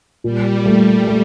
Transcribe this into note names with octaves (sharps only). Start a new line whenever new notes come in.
A#2 G3
A3
A3